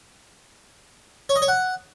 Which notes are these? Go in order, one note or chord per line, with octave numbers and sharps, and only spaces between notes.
C#5
D#5
C#5
F#5